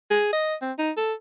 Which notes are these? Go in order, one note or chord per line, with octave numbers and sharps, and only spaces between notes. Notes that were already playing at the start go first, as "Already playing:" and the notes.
G#4
D#5
C4
D#4
A4